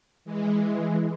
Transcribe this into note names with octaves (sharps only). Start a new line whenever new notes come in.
E3 G#3
E3 G#3